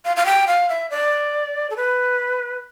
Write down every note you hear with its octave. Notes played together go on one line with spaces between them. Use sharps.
F5
F5
G5
F5
E5
D5
A4
B4